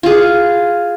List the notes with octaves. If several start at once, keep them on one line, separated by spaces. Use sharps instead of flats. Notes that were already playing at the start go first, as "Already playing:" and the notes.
F4 G#4